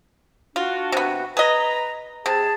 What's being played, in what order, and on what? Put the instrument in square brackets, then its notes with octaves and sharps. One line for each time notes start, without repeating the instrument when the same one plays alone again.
[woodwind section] D4 F#4 [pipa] F4
[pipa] C3 B3
[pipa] G#4 D#5 [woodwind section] B4 A#5
[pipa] C3 [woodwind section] G#4 A5